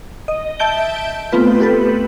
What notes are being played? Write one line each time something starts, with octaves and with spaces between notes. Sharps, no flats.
D#5
E5 A5 G6 D7 G7
A3 B3 C4 F4 B4
G4 A4 B4